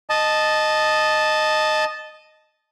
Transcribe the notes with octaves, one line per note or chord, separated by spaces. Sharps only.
D#5 A5